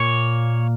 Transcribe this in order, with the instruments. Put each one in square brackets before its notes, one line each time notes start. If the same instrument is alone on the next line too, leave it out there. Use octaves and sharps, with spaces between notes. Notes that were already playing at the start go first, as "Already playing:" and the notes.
Already playing: [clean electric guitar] A#2 A#3 C#5